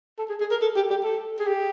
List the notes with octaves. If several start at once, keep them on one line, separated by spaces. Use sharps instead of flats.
A4
G#4
G#4
A#4
A4
G4
G4
A4
G#4
G4